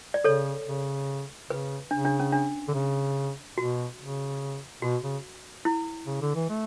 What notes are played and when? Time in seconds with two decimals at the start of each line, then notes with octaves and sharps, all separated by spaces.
0.14 D5
0.24 C#3 A4 C#5
0.67 C#3
1.49 C#3 B4
1.91 C#3 D4
2.05 D4
2.20 C#4
2.32 D4
2.68 D3
2.74 C#3
3.57 B2 F#4
4.00 C#3
4.82 B2 F#4
5.03 C#3
5.65 E4
6.07 C#3
6.21 D3
6.35 E3
6.50 A3